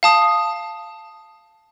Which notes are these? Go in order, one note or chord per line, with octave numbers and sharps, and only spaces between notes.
F5 A5 D#6